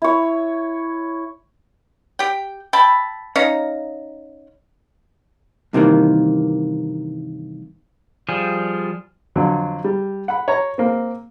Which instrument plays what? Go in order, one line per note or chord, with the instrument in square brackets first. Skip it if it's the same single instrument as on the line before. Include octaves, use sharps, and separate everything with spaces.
[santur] E4 C#5
[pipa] G4 G5
E5 G5 A5 B5
C#4 D#4 F5 A#5
[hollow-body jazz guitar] G2 C3 D#3 E3 A#3
[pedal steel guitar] F3 G3 G#4
[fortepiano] F2 D3 F#3
G3
F#5 B5
C#5 A#5
A#3 C4